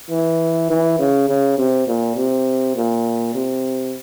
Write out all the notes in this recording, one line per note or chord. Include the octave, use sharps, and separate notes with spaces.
E3
E3
C#3
C#3
C3
A#2
C3
A#2
C3